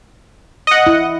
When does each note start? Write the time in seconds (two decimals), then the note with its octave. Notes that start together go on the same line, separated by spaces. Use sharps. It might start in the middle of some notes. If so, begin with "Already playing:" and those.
0.67 D#5 F#5
0.87 E4